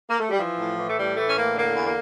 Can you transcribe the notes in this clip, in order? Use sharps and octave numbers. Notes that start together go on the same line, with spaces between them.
A#3
A3
G3
E3 F3
A2
E3
A3
A2 G3
E3 A3
C#4
A2 A#3
D3 A#3
E2
A#3